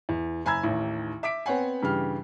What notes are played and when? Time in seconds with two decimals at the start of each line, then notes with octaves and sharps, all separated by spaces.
0.09 E2
0.45 F#1 G#5 A#5 B5 E6 G#6
0.63 A1 D#2 D#3
1.23 E5 D6 B6 D7
1.46 B3 C4 C#5 F#5 G#5
1.82 G2 C#3 E3 G4 F6